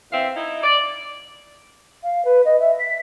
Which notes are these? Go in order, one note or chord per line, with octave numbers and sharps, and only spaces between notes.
E2 C4 E5 F5
D#4 E4
D5
F5
B4
D#5
E5
B6